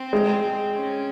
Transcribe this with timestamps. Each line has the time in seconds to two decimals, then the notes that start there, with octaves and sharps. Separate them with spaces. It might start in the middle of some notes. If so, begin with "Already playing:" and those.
Already playing: C4
0.13 G#3
0.75 C#4